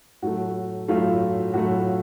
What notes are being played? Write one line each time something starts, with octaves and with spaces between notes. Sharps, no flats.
A2 F#3 A3 F#4
A2 F#3 A3 F4
A2 F#3 A3 F#4
F4